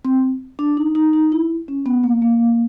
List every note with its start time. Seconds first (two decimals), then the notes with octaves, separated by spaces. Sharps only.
0.05 C4
0.59 D4
0.77 D#4
0.95 D#4
1.13 D#4
1.32 E4
1.68 C#4
1.86 B3
2.03 A#3
2.22 A#3